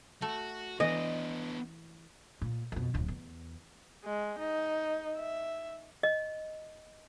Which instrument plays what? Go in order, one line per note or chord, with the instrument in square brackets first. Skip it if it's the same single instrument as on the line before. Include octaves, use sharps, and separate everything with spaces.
[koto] A3 [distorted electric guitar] F#4
[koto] E3 [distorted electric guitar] B3 D4 [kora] D#5
[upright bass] A#2
F2 B2
D1 F2
E2
[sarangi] G#3
D#4
E5
[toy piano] D#5